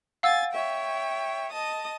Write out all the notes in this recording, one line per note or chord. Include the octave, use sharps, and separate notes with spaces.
F5 F#5 G#5 E6 A6
C#5 E5 G5
D#5 A5 D#6